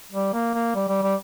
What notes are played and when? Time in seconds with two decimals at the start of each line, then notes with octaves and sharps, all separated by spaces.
0.13 G3
0.33 A#3
0.54 A#3
0.75 G3
0.88 G3
1.02 G3